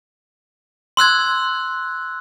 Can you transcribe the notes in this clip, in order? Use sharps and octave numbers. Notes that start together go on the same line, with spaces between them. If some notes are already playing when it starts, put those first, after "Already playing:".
C6 E6 F#6 G#6